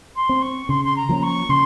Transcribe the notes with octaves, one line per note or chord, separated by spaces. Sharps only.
C6
C4
C#6
C#3 C6
C6
A#5
F3 A#3 C#4
C#6
C#3 C6